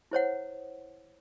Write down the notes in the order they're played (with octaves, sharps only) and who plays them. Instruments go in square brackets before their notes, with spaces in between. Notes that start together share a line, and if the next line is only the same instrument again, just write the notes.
[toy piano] E4 C5 C#5 F#5